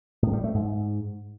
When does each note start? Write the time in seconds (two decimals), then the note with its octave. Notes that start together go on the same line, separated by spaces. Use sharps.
0.23 A2
0.33 G3
0.44 A3
0.55 G#2